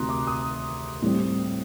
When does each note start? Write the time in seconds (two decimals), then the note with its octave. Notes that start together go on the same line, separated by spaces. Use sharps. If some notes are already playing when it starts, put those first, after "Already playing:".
Already playing: D2 C3 D#3 A#5 C6 D#6 F#6
0.09 D6
0.27 D#6
1.02 A2 G3 C4